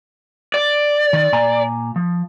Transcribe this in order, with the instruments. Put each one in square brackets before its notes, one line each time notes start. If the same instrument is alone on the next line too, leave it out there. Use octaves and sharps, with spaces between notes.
[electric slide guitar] D5
[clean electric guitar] D#3
A#2 G#5 A#5
F3